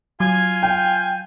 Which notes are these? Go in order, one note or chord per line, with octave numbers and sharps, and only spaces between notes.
F#3 F4 G#5 G#6
G5 G6